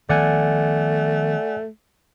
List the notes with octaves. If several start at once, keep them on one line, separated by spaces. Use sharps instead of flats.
D#3 F3 A3 B3 D5 F#5 G#5